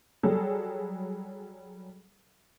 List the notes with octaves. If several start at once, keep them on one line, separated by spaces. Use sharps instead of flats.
F#3 G3 G#4 A4